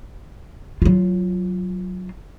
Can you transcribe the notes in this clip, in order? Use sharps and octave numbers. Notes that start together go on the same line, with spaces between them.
F#3 F4